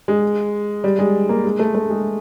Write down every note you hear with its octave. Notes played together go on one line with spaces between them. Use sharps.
G#3
G3
G#3
A#3
G#3
A3
A3
G#3